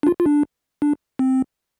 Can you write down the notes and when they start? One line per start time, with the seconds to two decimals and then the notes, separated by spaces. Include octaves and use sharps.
0.03 D4
0.07 F4
0.20 F4
0.26 D4
0.82 D4
1.19 C4